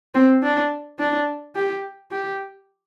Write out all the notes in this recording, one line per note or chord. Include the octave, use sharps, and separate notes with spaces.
C4
D4
D4
G4
G4